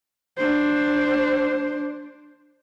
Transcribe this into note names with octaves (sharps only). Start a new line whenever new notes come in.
D4 C5